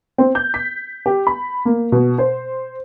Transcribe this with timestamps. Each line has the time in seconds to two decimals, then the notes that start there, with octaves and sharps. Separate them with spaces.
0.18 C4
0.35 G6
0.54 B6
1.06 G4
1.27 B5
1.65 A#3
1.92 B2
2.18 C5